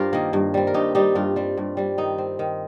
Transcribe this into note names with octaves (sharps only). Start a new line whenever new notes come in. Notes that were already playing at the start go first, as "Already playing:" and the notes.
Already playing: G2 F4 G4 A#4 C5
D#3 A#3
G2
G3 C4
A#4
G2 D#4 G4
G3 C4 D#4 G4
G2 F4
G3 C4
G2
G3 C4
D#3 D#4
C4
D#3